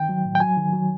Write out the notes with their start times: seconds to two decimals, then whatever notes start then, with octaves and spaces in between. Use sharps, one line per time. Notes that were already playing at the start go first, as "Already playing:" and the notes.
Already playing: D#3 G5
0.09 F#3
0.25 A2
0.35 G5
0.40 F#3 G#5
0.57 D#3
0.73 F#3